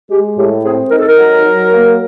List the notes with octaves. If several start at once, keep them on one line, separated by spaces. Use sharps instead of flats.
G#3 G4
A2 G4
C4 G#4
D#4 A#4
A4
A#4
F#3
F#3
A#3